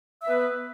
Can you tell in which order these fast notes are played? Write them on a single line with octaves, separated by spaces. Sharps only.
E5 B3 B4